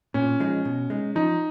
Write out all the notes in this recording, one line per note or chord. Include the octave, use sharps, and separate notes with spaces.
A#2 C#4
F3 G#3 D#4
B2
G#3 D#4
F3 D#4